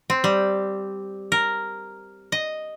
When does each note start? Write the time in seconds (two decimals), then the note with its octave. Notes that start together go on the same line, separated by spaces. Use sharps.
0.10 C4
0.24 G3
1.32 A#4
2.32 D#5